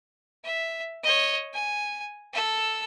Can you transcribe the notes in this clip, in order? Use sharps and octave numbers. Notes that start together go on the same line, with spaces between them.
E5
C#5 D#5
G#5
A4 E6